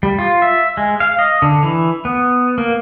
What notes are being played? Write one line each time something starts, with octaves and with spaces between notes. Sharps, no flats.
G3
F4
E5
G#3
F5
D#5
D3
E3
B3
A#3